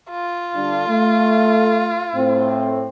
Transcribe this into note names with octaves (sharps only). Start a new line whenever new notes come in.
F4
D3 G3 D4
A3
A2 C4